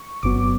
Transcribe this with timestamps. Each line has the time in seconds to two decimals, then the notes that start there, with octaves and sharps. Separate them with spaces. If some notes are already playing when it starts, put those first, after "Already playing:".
Already playing: C#6
0.23 G1 G2 F#3 B3 D6